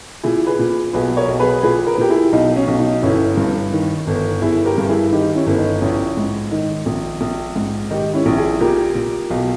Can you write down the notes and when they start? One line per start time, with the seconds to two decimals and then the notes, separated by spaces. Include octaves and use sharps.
0.23 A#2 E4 G#4
0.47 G#4 B4
0.59 A#2
0.93 B1 G#4 B4
1.17 A#4 C#5
1.28 B1
1.40 G#4 B4
1.63 A#2 G#4 B4
1.87 A#4
1.94 B4
1.98 A#2 G4 A#4
2.10 E4 G#4
2.33 B1 D#4
2.56 C#4
2.68 B1
2.79 D#4
3.02 G1 C#4 E4
3.37 G2
3.73 D#3
4.07 G1
4.42 G1 E4 G#4
4.65 G4 A#4
4.78 G2
4.89 E4 G#4
5.12 D#3 D#4 G4
5.35 C#4 E4
5.47 G1
5.58 D#4
5.82 A#1 C#4 E4
6.17 G#2
6.51 D#3 D#4
6.86 A#1
7.21 A#1
7.56 G#2
7.90 D#3 D#4 G4
8.14 C#4 E4
8.26 A#1
8.37 E4 G#4
8.60 A#2 G4 A#4
8.95 A#2
9.30 B1